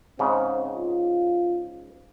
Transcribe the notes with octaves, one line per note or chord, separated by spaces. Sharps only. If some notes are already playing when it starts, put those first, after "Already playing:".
G#2 C#3 C4
F4